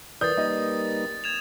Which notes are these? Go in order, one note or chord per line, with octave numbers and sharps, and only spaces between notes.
E3 A#4 B4 D5 D#6 G6 A6
G3 A#3 D#4 D#5
G#6 E7 F7